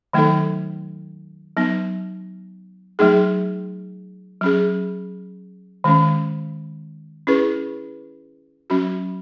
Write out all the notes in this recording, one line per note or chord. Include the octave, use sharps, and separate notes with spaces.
D#3 F#3 A3 D#4 A4
F#3 B3 D#4
F#3 A3 D#4 G#4
F#3 C#4 G#4
D#3 G#3 C#4
C#4 E4 G#4 B4
F#3 C#4 F#4